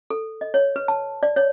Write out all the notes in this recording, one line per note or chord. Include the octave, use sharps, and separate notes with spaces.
A4
D#5
C#5
B4
A5
D5
C#5